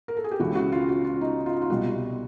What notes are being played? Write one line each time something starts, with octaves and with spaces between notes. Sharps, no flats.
A#4
A4
G#4
G4
C#2 C#3 E3 F#4
F#4
F4
F#4
F4
D#4
F4
D#4
F4
C2 B2 G3 F#4